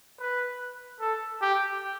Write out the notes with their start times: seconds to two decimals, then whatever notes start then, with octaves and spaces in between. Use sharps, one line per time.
0.21 B4
1.01 A4
1.42 G4